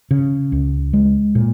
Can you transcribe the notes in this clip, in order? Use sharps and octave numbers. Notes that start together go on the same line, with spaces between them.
C#3
C#2
G#3
A#2